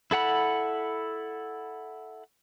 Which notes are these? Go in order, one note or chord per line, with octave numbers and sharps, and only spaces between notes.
E4 A4 F#5 B5